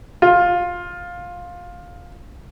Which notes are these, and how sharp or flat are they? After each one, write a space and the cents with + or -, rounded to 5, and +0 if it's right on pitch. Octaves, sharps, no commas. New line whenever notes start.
F4 +15